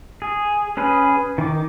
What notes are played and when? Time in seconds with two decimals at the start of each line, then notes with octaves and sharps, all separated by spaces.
0.22 G#4
0.77 C#4 G#4 B4
1.38 D#3 D6